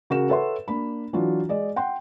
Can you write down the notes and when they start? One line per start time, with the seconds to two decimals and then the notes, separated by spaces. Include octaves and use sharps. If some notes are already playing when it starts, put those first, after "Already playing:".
0.10 C#3 F#4 A#4 E7
0.30 A4 B4 C#5 E5 F#5 C6
0.68 A#3 D4 B5
1.13 E3 F#3 D4 F4
1.49 G#3 D5 D#5
1.76 F#5 G5 C6